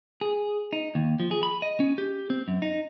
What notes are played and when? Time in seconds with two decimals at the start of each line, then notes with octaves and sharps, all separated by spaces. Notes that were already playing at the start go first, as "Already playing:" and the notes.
0.21 G#4
0.73 D#4
0.95 D#2
1.20 F3
1.31 G#4
1.43 B5
1.62 D#5
1.80 C#4
1.98 G4
2.30 C4
2.48 F#2
2.62 D#4